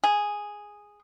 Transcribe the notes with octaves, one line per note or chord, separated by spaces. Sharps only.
G#4